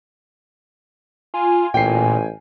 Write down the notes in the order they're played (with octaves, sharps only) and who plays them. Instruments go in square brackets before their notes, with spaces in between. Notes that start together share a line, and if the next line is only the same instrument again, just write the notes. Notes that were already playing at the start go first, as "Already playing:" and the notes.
[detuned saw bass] F4 [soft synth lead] G#5
[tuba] A1 [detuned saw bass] A#2 [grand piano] G5 C7